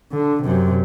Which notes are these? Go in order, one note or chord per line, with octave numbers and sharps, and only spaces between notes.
D3
F#2 C3